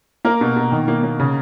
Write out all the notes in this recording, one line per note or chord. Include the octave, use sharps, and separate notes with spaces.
A#3 A#4
B2
B2
D#3
A#3
A#3
C#3